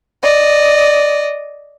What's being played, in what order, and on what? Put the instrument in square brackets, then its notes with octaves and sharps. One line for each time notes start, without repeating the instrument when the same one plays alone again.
[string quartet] D5 D#5